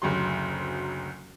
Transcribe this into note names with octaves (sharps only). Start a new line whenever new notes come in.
F#1 D2 F#3 C6